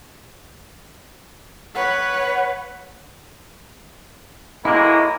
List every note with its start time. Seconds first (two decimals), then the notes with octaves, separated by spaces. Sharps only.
1.75 B4 C#5 F#5
4.65 B1 G#3 A#3 E4